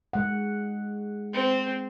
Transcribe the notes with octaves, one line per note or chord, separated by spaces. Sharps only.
G#3 F#5
C4 C5